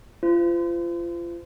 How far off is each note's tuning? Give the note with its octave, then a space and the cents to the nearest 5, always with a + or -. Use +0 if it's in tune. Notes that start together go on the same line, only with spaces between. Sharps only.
F4 -30 C5 -35